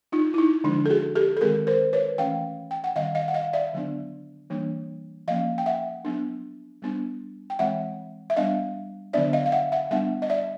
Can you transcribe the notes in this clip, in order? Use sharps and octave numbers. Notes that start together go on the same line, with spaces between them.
D#4 F4
E4
D#4
D3 F3 G#3 D4
A4
F#4 G#4
G4 A4
A4
D#3 G#3 C4 G#4 A#4
A#4 C5
B4 C#5
E3 A3 C#4 F5 G5
G5
F#5
D#3 G3 C4 D#5 F5
D#5 F5
F#5
D#5 F5
D5 E5
D3 F#3 B3 D4
E3 G3 A#3 D4
F3 A#3 C#4 D#5 F5
G5
E5 F#5
F#3 B3 D4
G3 B3 D4
G5
E3 G#3 C4 E5 F#5
E5
G3 B3 D4 D#5 F5
D3 F#3 B3 D4 D5 E5
D#5 F5
F5
E5 F#5
E5 F#5
G3 B3 D4 E5 F#5
D#5
D5 E5